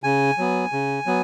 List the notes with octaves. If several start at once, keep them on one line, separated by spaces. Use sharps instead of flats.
C#3 G#5
F#3 B3
C#3
F#3 B3